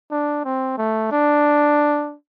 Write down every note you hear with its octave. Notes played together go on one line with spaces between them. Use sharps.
D4
C4
A3
D4